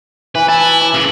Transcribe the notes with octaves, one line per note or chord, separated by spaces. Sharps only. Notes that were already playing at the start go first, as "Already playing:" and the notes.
E3 B4
E4 A5
D6
C#3 A#3